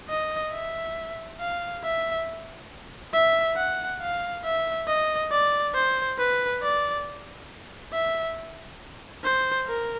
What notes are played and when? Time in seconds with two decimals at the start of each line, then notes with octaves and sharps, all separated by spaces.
0.09 D#5
0.52 E5
1.40 F5
1.84 E5
3.14 E5
3.57 F#5
4.01 F5
4.44 E5
4.88 D#5
5.32 D5
5.75 C5
6.19 B4
6.63 D5
7.93 E5
9.24 C5
9.67 A#4